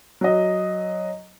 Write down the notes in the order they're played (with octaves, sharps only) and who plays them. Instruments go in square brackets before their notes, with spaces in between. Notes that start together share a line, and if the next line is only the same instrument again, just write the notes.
[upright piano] F#3 D#5